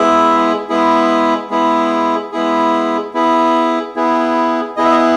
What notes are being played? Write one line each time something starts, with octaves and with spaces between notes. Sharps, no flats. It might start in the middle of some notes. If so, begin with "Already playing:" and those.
Already playing: G#3 B3 E4 G#4 E5
G#3 B3 E4 G#4
G#3 B3 E4 G#4
G#3 B3 E4 G#4
B3 E4 G#4
B3 E4 G#4
B3 E4 G#4 D#5
E5
D#5